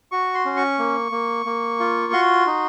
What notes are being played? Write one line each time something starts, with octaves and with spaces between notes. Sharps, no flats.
F#4 C#6
C6
C#4
C#6
A#3
A#3
A#3
F4
F#4 C6
D#4